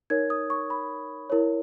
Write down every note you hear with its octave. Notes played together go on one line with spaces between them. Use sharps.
D#4 A#4 C#5 G#6
D#6
C#6
B5
E4 A#4 C#5